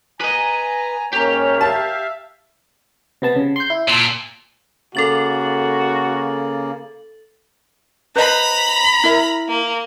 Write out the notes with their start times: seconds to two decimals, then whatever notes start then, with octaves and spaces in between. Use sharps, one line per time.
0.20 B4 D#5 G#5 A#5
1.13 G#2 A#3 C#4 G4 A#4 C#5
1.61 E5 F5 A5
3.22 C3 B3 A5
3.36 C#3
3.56 C6 G6
3.70 E4
3.88 A#2 A5 C6 E6
4.95 C#3 A#3 F#4 A4 A6 F#7
8.16 B4 C5 D#5 A#5 B5
9.04 E4 A#4 E5
9.48 A#3